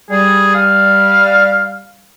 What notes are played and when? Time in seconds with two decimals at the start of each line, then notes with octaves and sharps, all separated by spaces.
0.10 G3 G#4
0.54 F5